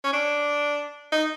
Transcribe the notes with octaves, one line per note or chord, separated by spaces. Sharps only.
C#4
D4
D#4